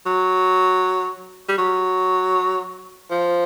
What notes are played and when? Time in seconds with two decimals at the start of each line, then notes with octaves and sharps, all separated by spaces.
0.06 F#3
1.48 G3
1.58 F#3
3.10 F3